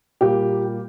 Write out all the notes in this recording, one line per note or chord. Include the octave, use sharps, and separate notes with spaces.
A#2 G3 A#3 G4